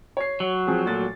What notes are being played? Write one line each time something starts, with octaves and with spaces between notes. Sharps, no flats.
C#5 C7
F#3
F3 C4 G#4
A#2 A3 A6